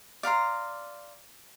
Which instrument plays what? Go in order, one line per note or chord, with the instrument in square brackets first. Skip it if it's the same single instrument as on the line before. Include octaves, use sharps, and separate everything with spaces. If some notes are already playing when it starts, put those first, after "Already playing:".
[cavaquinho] D5 F5 A#5 C6